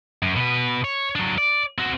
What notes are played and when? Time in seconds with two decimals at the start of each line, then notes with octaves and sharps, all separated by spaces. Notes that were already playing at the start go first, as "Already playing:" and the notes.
0.22 F#2
0.36 B2 B4
0.84 C#5
1.16 F#3 D4
1.38 D5
1.78 C4 F#4